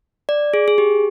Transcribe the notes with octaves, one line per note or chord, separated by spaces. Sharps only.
D5
G#4
G#4
G4